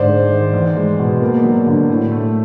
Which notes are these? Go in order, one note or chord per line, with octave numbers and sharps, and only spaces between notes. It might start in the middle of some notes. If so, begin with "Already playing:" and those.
Already playing: G#2 D3 C5 D5
G#3
D#3
E2
G#3
B2
A#3
F#3
D3
A2
A3